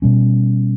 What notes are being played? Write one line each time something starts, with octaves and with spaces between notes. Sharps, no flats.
B2 G3 C#4